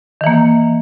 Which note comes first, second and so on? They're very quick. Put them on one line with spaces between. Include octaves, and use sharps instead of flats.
D#3 E3 A#3